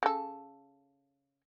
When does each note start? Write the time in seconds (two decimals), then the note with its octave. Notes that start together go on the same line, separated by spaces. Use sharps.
0.03 C#3 A4